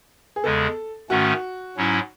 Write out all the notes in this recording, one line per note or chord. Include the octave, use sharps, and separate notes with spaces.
G#4
E2 C#3 G#3 A4
G#2 D#3 A3 C#4 F#4
G#2 F#3 C#4 E4